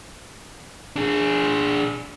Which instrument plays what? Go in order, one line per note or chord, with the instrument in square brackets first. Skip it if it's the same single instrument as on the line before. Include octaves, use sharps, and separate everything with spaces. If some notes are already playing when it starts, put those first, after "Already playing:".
[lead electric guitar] D4 G#4